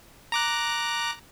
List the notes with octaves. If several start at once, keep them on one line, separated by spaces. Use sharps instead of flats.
A#5 D6 F#6